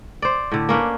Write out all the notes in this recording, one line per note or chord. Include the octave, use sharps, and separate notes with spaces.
C5 D5
A2 D3
A#3 C#4 D4 B4